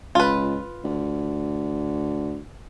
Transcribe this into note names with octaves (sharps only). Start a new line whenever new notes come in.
C#2 F4 B4
D2